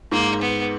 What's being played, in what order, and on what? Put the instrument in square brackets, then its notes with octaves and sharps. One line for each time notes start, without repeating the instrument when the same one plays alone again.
[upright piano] G#2 [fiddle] A#3
[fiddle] B3